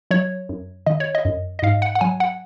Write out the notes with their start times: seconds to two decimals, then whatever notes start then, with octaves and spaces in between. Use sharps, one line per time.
0.11 F#3 C#5
0.49 F#2
0.86 D#3 D#5
1.00 C#5
1.15 D#5
1.25 F#2
1.59 D#5
1.62 G#2 F5
1.82 F#5
1.95 F#5
2.01 F#3 G#5
2.20 F#5